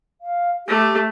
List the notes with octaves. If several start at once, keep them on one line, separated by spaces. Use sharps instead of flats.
F5
A3 G4